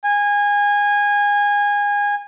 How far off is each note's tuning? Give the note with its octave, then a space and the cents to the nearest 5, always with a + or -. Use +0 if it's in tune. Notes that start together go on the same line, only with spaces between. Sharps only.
G#5 -25